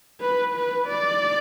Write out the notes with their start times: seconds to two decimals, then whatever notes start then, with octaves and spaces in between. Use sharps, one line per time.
0.21 B4
0.54 B4
0.87 D5